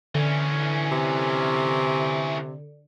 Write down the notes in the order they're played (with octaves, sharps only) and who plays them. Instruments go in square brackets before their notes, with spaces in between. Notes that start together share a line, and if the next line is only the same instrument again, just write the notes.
[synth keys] D3 [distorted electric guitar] E3 C#4
[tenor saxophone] C3